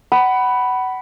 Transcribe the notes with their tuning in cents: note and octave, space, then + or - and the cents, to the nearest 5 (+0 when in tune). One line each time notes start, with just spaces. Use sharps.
F#5 +25 B5 +0